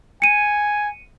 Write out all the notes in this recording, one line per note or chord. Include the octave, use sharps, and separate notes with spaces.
G#5 C#7 D#7